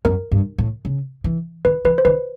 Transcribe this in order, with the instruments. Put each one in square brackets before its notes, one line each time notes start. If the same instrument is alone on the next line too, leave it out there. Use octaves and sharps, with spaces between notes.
[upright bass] F#2 [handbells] A#4
[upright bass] G2
A2
C#3
E3
[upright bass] D#3 [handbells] B4
[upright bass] E3 [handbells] B4
[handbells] C5
[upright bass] D#3 [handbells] B4